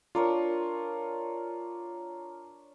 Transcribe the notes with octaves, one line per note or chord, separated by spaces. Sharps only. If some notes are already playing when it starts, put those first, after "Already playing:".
D4 F4 A#4 C#5